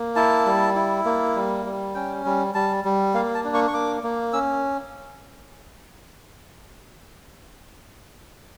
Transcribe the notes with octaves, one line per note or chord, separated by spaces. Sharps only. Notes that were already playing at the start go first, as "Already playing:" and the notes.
Already playing: A#3
E4 A5
G3
E4
A#3
G3
G3
C#4 G5
G3
G3 A5
G3
A#3 F5
A5
D4
C#6
C#6
A#3 D6
A#3
C#4 E6